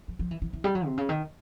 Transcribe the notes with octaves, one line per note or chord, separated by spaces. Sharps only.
F3
F3
E3
E3
E3
G3
F#3
C3
C#3
D#3